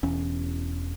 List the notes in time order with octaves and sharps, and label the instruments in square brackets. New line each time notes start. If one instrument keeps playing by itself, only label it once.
[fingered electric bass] E1 E2 C#4